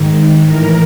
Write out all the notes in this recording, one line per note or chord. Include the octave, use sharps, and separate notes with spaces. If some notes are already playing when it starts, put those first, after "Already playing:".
Already playing: G#2 D#3
A2 E3 A#4